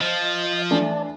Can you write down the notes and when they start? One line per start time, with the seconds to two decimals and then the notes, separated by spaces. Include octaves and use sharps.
0.01 F3 D#5
0.71 E3 A3 D4 D5 A5